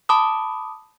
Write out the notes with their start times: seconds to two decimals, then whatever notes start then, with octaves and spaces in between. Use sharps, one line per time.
0.09 A5 B5 D6 D#6